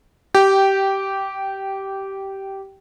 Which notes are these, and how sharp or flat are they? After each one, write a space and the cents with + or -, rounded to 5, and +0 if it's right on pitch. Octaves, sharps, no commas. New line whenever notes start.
G4 -15 G5 -10